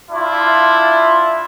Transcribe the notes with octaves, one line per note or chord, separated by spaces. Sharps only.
D4 E4 F4 E5